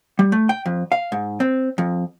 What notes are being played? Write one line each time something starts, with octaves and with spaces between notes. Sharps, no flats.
G3
A3
G5
F2
F5
G#2
C4
F2